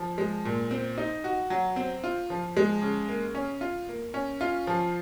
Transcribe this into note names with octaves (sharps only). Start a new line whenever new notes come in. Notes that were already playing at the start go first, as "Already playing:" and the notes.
Already playing: F3
G#3
A#2
C4
D#4
F#4
F#3
C4
F4
F3
G#3
C#3
A#3
C#4
F4
A#3
C#4
F4
F3